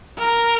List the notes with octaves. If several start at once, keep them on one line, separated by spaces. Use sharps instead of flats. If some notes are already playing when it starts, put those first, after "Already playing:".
A#4